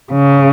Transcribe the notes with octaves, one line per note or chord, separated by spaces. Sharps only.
C#3